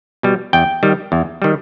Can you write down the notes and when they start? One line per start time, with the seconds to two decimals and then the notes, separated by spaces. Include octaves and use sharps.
0.23 B2 G3
0.53 E2 G5
0.83 D#3 G3
1.12 E2
1.42 D#3 G3